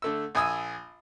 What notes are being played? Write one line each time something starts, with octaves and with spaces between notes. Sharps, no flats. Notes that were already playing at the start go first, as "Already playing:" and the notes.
D3 A3 E6
A#1 G#5 D#6 E6